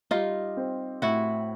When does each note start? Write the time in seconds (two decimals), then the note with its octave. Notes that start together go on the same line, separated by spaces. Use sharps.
0.11 G3 D#4 F4
0.57 C4
1.02 A2 E4 F#4